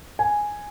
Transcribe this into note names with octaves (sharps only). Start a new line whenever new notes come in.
G#5